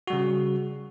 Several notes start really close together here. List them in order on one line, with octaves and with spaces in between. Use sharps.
F#4 G3 C#3